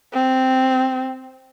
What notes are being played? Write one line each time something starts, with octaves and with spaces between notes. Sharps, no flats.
C4